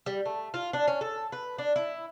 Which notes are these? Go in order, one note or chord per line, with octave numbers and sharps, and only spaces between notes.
G3
A3
F4
D4
C#4
A4
B4
D4
E4